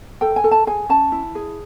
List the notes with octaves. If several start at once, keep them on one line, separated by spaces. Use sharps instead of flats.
A4 G5
G#5
A4
A5
G#4 G#5
C#4 A5
E4
G#4